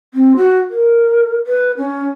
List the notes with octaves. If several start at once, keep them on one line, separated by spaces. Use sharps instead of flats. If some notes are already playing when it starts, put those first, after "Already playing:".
C4
F#4
A#4
B4
C#4